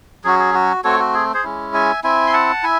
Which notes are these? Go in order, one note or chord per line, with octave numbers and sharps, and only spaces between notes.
F#3 C#4 F#4 G#4
G#4
F#4
A3 C4 F#4 A4 C#5
F#4
G#4
G#4 C5
G#3 C#4 E4
E5 G#5
C4 E4 E5 G#5
C6
F#5 A5
E4 E5 G#5